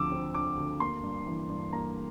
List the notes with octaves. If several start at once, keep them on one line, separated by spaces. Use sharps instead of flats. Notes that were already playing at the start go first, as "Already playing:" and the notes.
Already playing: D2 D3 F3 C4 D6 E6
C4
D3 D6
D2
A#3 C6
G2
E3
G2
A#3 A#5